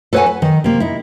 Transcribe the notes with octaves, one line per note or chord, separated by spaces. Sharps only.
A4 B4 C#5 D#5 F#5 G#5
B4
D#3
C3 A#3
D#4 E4